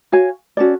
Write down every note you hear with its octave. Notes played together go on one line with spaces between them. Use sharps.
F#4 C#5 F5 G#5
C#4 F#4 A4 D5